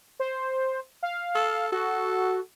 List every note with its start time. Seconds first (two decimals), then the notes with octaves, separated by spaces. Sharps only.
0.20 C5
1.03 F5
1.35 A4
1.72 F#4 A4